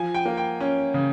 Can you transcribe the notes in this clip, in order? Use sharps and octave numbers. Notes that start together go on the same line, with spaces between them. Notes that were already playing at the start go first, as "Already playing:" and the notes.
Already playing: F3 G#5
G5
A#3
G5
C#4
C#3